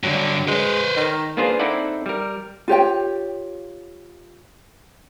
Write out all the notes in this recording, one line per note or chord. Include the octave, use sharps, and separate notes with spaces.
G2 D3 F#3
G#3 B4 C5
D#3
A#3 B3 D4 F4 G#4 C5
C4 D#4 E4 A4 D5 F#5
G3 A#4
F4 G4 C#5 G5